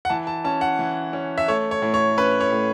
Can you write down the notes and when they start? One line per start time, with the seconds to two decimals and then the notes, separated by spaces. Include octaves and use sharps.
0.05 F#5
0.10 E3 A5
0.27 A5
0.44 C#4 A5
0.61 F#5
0.79 E3
1.13 C#4
1.38 E5
1.48 A3 C#5
1.71 C#5
1.82 A2
1.94 C#5
2.18 C#4 B4
2.40 C#5
2.52 A2